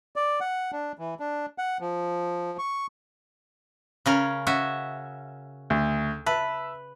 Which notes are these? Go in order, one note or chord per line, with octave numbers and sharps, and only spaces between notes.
D5
F#5
D4
E3
D4
F#5
F3
C#6
C#3 C#4 A#4
C#4 F#4 E5
D2
B4 E5 A5